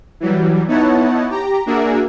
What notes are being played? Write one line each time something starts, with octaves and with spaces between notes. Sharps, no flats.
E3 F#3 G3
B3 D#4 E4 C#5 F#5 A5
G4 A#5
A#3 D4 F#4 G#4 A#4 E5